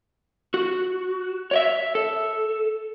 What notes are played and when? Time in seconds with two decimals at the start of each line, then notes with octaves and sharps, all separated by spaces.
0.54 F#4
1.51 C#5 D5 E5
1.95 A4